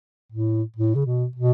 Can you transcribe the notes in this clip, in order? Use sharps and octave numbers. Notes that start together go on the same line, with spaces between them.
A2
A2
C#3
B2
B2